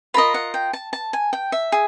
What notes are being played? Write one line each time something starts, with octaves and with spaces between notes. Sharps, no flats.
F4 A#4 D#5 B5
F#5
G5
A5
A5
G#5
G5
E5
G#4